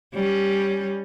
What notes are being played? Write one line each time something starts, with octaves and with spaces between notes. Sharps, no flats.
G3 C#4